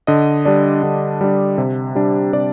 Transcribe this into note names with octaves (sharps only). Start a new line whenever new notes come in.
D3 D#5
G3 D4 D5
D3
G3 D4
C3
G3 D4
C3 D5